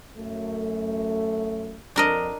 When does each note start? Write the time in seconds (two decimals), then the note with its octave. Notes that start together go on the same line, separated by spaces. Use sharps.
0.17 F#2 A3
1.96 F2 D4 A#4 D#5